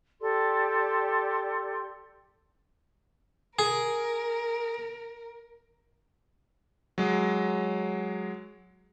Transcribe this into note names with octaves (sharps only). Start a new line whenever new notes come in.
G4 A4 D5 C6
G#4 A#4
F#3 G#3